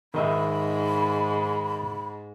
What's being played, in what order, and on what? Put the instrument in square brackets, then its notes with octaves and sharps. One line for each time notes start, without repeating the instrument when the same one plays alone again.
[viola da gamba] G#2 [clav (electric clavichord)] D#3 D#5 E5 [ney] B5